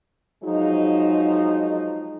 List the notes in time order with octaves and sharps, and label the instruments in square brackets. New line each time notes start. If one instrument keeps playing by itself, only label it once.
[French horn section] F3 F#3 G#3 D#4